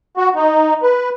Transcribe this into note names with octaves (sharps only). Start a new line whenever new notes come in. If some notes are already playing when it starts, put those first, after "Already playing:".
F#4
D#4
B4